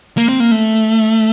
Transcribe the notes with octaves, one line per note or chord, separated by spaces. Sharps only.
A#3
C4
A#3
A3